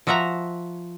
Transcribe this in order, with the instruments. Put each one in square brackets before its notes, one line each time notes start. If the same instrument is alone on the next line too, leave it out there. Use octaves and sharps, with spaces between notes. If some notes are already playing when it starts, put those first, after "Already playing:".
[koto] F3 F#4 E5 F#5 A#5